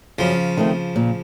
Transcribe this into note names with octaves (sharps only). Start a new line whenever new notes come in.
F#2 C#3 F3
D#3 A3 C4
A#2